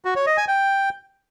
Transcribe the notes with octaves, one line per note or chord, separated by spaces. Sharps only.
F#4
C#5
D#5
G#5
G5